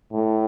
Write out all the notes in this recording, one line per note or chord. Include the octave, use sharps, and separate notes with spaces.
A2